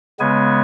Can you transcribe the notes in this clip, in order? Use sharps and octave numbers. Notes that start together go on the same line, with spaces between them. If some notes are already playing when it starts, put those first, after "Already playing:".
C#3 G#3 B3 G#5